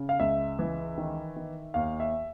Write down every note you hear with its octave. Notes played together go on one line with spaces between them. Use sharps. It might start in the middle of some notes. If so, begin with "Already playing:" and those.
Already playing: C#3
F5
C#2 E5
E3
D#3
D#3
D#2 F5
E5